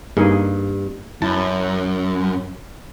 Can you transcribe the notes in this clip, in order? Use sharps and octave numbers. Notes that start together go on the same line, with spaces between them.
G2 A#3 D#4 G#4
F#2 E4 A5